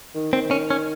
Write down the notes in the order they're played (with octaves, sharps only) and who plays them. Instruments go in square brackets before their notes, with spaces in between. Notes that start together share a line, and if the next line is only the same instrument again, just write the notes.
[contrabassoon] D#3
[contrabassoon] D#3 [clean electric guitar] C4
[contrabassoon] D#3 [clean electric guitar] C#4
[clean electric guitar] C#4